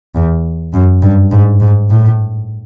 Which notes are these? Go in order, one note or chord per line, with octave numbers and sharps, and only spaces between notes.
E2
F#2
G2
G#2
G#2
A2